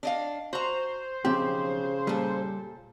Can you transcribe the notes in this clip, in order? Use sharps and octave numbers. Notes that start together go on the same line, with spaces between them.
D4 D#5 F5
F#4 C5 A#5
B1 C#3 F3 C4 G4
A#2 G3 A4